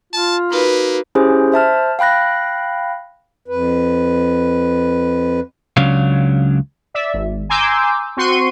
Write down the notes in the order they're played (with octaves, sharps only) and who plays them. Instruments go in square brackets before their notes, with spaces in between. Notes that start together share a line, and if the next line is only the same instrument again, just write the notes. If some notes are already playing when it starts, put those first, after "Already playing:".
[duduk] F4 [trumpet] A5
[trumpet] A#3 [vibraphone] D#4 F#4 A#4 [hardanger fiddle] B4
[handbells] C#4 E4 G4 G#4 C5
C5 E5 A5 F6
F5 G5 B5 F#6 A#6
[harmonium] F2 B4
[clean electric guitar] C#2 C#3 F#3 C#4 D4 F5
[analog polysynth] D5 E5
G#1
G#5 A#5 C6 D6 E6 G6
C4 F#4 C6 C#6 D#7